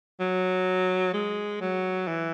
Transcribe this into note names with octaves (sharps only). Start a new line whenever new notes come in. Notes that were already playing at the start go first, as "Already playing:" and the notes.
F#3
G#3
F#3
E3